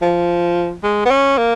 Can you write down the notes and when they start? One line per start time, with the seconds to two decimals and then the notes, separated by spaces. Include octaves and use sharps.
0.02 F3
0.83 G#3
1.06 B3
1.11 C#4
1.38 A#3